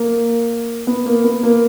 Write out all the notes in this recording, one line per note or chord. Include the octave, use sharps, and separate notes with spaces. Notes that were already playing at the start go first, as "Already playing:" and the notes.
Already playing: A#3
B3
A#3
B3
A#3